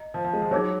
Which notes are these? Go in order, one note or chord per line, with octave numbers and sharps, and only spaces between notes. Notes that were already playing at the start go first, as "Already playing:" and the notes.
Already playing: D#5 A#5
F3
F3
G#3
F3
F#3 D#4 G#4 C#5